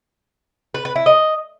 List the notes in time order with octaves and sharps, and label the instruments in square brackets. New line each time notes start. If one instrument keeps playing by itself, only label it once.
[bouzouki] B4
B4
E4
D#5